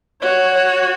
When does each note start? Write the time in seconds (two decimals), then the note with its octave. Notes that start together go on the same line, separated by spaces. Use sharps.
0.22 F#4 C#5
0.54 C#5